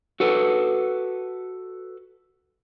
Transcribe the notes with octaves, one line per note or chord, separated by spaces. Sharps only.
F#4 A4 B4